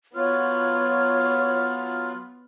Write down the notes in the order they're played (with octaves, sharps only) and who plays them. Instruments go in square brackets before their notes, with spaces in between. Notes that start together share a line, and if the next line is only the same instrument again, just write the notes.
[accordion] F#3 F4 [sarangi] B3 [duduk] C#5 [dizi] F6